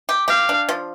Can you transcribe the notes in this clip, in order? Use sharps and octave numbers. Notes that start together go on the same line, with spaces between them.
G4
G4 F5
D4
F3